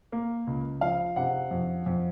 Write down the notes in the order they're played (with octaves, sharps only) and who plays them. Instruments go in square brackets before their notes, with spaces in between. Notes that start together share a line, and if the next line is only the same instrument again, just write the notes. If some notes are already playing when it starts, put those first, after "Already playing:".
[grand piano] A#3
C#2
[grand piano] F3 [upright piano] F5
[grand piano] C3 [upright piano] F#5
[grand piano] F2
F2